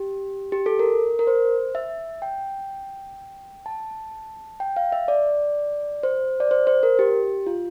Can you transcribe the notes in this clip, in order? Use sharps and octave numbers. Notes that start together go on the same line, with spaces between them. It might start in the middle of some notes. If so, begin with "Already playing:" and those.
Already playing: G4
G4
A4
A#4
A#4
C5
E5
G5
A5
G5
F5
E5
D5
C5
D5
C5
C5
A#4
G4
F4